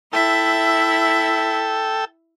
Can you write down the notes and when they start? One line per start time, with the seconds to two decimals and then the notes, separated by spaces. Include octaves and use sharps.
0.13 E4 A4 E5 G5 E6